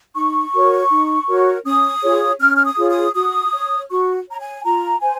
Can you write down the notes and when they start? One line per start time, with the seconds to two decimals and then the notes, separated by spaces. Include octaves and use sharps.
0.15 D#4 C#6
0.53 F#4 A#4 C#5
0.90 D#4
1.28 F#4 A#4 C#5
1.65 C#4 D#6
2.02 F4 G#4 C#5
2.40 C#4 F6
2.57 F6
2.65 D#6
2.78 F4 G#4 C#5
2.90 D#6
3.14 F#4 D#6
3.52 C#5
3.90 F#4 C#6
4.27 C#5 A#5
4.39 G#5
4.64 F4 A#5
5.01 C5 G#5